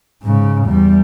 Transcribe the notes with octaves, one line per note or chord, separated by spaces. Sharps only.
G#2 C#3
E2 G3